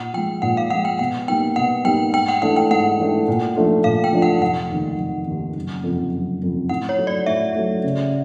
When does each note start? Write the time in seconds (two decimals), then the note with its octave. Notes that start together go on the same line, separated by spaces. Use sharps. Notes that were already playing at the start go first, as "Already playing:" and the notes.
Already playing: A#2 F#5
0.13 F3 G#3 G5
0.42 A#2 F#5
0.57 F5
0.70 F3 G#3 F#5
0.85 G5
0.99 B2 F#5
1.28 G3 A#3 D#4 G5
1.56 B2 F#5
1.85 G3 A#3 D#4 G5
2.14 G#2 G5
2.28 F#5
2.42 E3 A3 D4 F#5
2.56 G5
2.71 G#2 F#5
2.99 E3 A3 D4
3.28 A#2
3.56 F3 A3 D4 F4
3.84 A#2 F5
4.04 G5
4.12 F3 A3 D4 F4
4.22 F#5
4.41 F1 F#5
4.70 D#2 D#3
4.98 F1
5.27 D#2 D#3
5.56 F#1
5.84 F2 C3
6.13 F#1
6.42 F2 C3
6.69 A2 F#5
6.89 C#5
6.98 F#3 A3
7.07 D5
7.26 A2 E5
7.55 F#3 A3
7.84 C#3